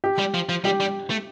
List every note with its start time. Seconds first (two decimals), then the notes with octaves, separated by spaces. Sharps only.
0.04 G4
0.19 G3
0.34 F3
0.49 F3
0.64 G3 G4
0.80 G3
1.10 A3